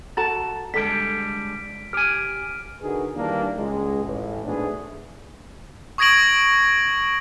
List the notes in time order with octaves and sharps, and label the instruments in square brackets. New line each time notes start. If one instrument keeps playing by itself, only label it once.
[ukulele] F#4 A4 A#5 [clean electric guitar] A5 [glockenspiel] A6
[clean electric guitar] D3 G3 G#3 [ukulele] A4 [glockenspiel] B6 D7
[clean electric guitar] G4 G#5 [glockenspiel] F6 D7
[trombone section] D3 D#4 F#4 G#4 A#4 B4
D#3 E3 G3 A#3 D4
C#2 G#3
A1 A2
G#2 B2 A3 D4 G#4 B4
[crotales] C#6 D#6 G#6 A#6 D7 F#7